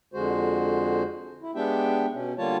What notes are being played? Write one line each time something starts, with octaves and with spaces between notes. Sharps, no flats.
F2 D3 G#3 F#4 C5
E4
G#3 B3 D4 G4 E5 G5
B2 C#4
D3 G3 A#3 F4 C#5 A5